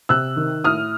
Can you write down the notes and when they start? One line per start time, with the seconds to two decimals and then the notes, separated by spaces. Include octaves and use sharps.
0.09 C3 E6 F#6
0.36 D#3
0.64 A2 D#6 F6